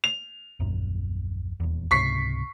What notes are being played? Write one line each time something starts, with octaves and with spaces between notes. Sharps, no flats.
F7
D#1 A#1 F#2
D#1 E2
C#2 G#2 C3 C#6 B6 C7